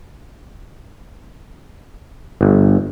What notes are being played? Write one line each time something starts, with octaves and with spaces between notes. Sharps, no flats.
G1